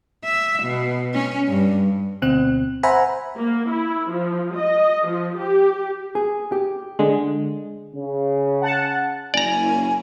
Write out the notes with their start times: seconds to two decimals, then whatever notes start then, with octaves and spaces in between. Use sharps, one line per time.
0.24 E5
0.63 B2
1.14 C#4
1.48 G2
2.22 D2 B2 C4 F#6
2.83 C5 E5 F#5 G#5 A#5 B5
3.38 A#3
3.70 E4
4.11 F3
4.57 D#5
5.08 F3
5.39 G4
6.15 G#4
6.52 G4
6.99 D3 G#3
7.94 C#3
8.62 F#5 A5
9.34 F#1 A#3 C#4 E4 D5 G#5 A#5